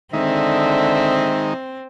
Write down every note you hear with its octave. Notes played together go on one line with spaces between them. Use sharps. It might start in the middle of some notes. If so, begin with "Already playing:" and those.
D3 D#3 G#3 C4 D#4 E5